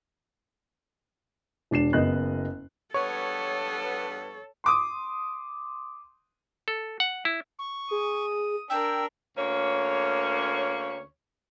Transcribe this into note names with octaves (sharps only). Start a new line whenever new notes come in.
E1 D4 C7 E7
F#1 B3 D#5 F#6
G2 B3 A4 C#5 C#6
C6 D6 D#6
A4
F#5
E4
C#6
G#4 D#6
D4 A#4 G5 E6
D2 A#3 C#4 C#5